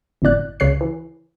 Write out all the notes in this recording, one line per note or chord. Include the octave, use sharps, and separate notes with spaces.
G1 F2 A2 D5 F#6
C#2 C#3 C#5 F#6 C7
E3